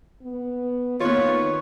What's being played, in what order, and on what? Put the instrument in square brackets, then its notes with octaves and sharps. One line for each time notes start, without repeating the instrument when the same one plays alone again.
[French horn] B3
[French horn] D#3 [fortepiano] B3 F4 [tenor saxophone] C#5